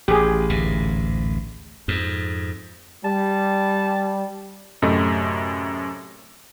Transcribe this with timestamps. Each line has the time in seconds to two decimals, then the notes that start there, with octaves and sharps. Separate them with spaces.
0.08 A1 G4 G#4
0.50 D1 A1 G#2
1.88 F2 G#2
3.05 G3 A5
4.82 F#2 A2 C3 A3 D#5